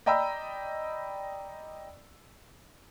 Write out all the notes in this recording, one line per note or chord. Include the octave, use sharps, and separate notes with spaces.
D5 D#5 G5 A#5 B5 E6